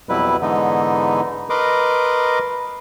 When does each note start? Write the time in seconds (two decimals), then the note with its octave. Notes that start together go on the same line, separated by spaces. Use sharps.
0.09 F2 B2 F#3 G3 E4 B4
0.41 G#2 D3 E3 B3 D#4
1.50 A#4 B4 D#5 C6 D6